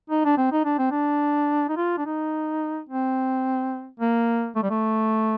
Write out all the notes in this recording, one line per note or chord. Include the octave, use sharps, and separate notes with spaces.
D#4
D4
C4
D#4
D4
C4
D4
D#4
F4
D4
D#4
C4
A#3
A3
G3
A3